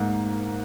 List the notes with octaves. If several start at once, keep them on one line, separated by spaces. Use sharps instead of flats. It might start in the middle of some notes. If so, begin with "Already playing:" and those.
Already playing: G#2 A#3